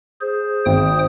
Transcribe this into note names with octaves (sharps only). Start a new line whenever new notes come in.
G#4 C5
G#1 C5 G5 D#6